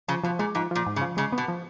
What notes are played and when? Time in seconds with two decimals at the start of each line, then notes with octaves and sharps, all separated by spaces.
0.08 C#3 F3
0.24 B2 F3
0.39 A#2 G#3
0.55 G#2 F3
0.71 A#2 F3
0.86 G#2
0.96 C#3
1.01 F3
1.17 C#3 G#3
1.32 B3
1.38 B2
1.48 F3